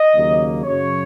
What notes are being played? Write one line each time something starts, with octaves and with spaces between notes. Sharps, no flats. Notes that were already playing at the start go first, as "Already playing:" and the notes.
Already playing: D#5
D#2 C#3 F#3 A#3
F#1 F#2 C#3 F#3 C#5